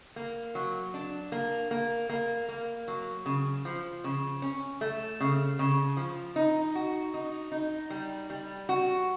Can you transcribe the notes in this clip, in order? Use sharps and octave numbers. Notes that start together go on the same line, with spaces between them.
A#3
F#3
D4
A#3
A#3
A#3
A#3
F#3
C#3
F3
C#3
C#4
A3
C#3
C#3
F3
D#4
F#4
D#4
D#4
G3
G3
F#4